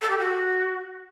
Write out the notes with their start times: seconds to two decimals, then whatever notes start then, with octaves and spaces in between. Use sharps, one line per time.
0.01 A4
0.10 G4
0.18 F#4